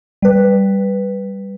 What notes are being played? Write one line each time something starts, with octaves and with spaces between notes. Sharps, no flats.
G3 B4